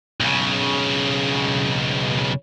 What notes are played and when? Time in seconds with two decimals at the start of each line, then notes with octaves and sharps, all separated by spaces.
0.20 B1 C#3